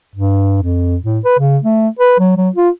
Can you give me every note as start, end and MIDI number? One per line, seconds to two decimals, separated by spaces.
0.15 0.61 43
0.62 0.97 41
1.04 1.19 45
1.25 1.39 71
1.39 1.58 49
1.64 1.89 57
1.99 2.15 71
2.19 2.36 54
2.37 2.49 54
2.56 2.69 65